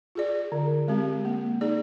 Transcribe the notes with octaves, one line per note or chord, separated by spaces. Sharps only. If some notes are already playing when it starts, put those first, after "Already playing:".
F4 G#4 D5
D3
G#3 C4 G4
A#3
D#4 G#4 D5